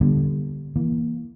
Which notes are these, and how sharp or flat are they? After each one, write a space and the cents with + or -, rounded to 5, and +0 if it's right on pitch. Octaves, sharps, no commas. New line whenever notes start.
D3 +0 G3 +0 B3 -40
E3 +0 A#3 +15